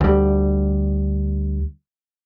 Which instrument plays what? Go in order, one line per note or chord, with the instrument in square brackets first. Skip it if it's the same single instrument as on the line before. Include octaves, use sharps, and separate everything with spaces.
[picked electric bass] D2 G3